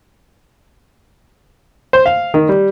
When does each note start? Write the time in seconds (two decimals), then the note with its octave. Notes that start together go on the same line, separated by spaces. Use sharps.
1.93 C5
2.06 F5
2.34 D#3
2.49 G3